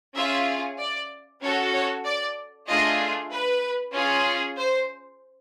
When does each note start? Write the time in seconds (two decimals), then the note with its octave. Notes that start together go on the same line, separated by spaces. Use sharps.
0.16 C#4 F4 G#4 E5
0.80 D5
1.42 C#4 F#4 A4 C#5
1.74 C#5
2.05 D5
2.68 A3 D4 F4 G#4 D#5
3.31 B4
3.94 C#4 F4 G#4
4.57 C5